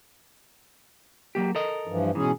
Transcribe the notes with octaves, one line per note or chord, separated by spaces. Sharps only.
F#3 A#3 G4
A4 A#4 D#5
G2 E3 F3
G#2 B2 E3 C#4 G#4